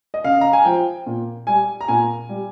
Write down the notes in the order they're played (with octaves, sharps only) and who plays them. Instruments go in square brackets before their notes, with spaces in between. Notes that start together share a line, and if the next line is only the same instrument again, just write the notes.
[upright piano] D#5
C#3 F5
A#5
G#5
F3 G5
A#2
G3 G#5
A#5
A#2 G#5
G3